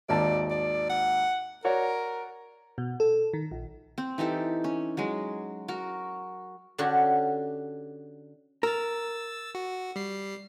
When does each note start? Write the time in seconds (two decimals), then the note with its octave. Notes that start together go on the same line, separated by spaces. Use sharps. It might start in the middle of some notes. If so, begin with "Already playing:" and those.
0.09 G#1 D#2 D5 A5
0.51 D5
0.90 F#5
1.65 F#4 A#4 C#5 D5
2.78 B2
3.00 A4
3.33 D#3
3.51 A#1
3.98 C4
4.18 E3 D#4 G4 A4
4.64 C#4
4.97 F#3 G#3
5.68 F#4 A#4
6.78 D3 C#4 D4 F#4 G4
8.63 A#4 E6 A6
9.55 F#4
9.96 G3 C7